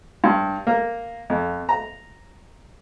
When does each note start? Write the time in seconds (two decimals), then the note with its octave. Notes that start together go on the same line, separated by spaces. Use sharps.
0.24 G2
0.67 A#3
1.30 F2
1.69 A#5